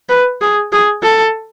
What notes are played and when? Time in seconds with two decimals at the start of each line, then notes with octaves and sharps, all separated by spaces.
0.09 B4
0.41 G#4
0.72 G#4
1.03 A4